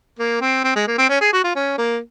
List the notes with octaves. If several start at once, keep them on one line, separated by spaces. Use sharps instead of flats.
A#3
C4
C4
G#3
A#3
C4
C#4
G#4
F#4
F4
C#4
A#3